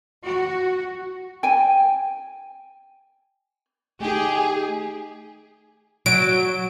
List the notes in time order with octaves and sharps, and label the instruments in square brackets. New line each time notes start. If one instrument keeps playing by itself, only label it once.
[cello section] F#4
[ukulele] G5 G#5
[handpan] A3 D#4 [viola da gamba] G4 [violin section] G#4
[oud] F#3 [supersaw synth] D7